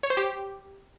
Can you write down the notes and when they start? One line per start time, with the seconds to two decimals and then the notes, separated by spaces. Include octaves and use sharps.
0.03 C#5
0.10 C5
0.17 G4